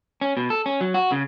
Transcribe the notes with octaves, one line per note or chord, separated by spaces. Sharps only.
C#4
B2
A4
C#4
F#3
F#4
C#3